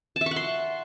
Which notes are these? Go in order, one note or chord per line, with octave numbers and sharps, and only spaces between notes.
A5
E5
C#6
F#5
C6